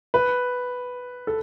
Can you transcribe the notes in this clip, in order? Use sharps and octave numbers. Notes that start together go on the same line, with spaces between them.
B4
A4